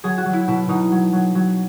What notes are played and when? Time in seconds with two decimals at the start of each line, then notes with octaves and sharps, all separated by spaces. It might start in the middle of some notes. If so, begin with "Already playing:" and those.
0.04 F#3 G#4
0.18 F#4
0.26 F#3
0.33 E4
0.48 B2 E4
0.69 B2 D#4
0.92 F#3
1.13 F#3
1.35 F#3